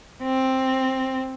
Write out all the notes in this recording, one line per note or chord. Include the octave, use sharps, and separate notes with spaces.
C4